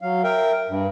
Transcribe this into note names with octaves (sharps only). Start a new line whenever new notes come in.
F#3 F5
A#4 E5 G5
G2